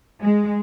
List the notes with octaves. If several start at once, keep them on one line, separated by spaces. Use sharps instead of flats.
G#3